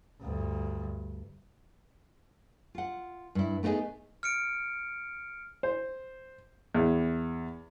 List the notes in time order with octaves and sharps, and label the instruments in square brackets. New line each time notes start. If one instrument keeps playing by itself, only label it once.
[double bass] D2 G2
[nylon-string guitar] F4 F#5
G2 E4
A3 B3 D#4 E4 G#4
[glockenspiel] F6 C#7 D7
[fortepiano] C5
E2